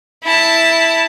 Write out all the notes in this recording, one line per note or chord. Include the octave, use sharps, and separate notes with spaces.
E4 A5